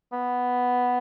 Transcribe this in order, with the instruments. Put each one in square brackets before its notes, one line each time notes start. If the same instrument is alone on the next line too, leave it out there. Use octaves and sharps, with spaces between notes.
[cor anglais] B3